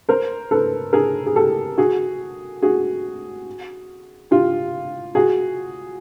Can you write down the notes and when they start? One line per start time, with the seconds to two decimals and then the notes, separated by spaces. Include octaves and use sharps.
0.09 A#4 C5
0.51 A4 B4
0.93 G#4 A#4
1.26 G#4
1.35 G4 A4
1.78 F#4 G#4
2.62 F#4 G#4
4.31 F4 G4
5.15 F#4 G#4